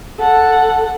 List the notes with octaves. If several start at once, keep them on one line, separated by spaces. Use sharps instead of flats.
A4 F#5